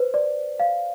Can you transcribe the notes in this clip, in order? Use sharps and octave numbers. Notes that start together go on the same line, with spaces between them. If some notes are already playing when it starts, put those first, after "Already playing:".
Already playing: B4 C5
D5
F5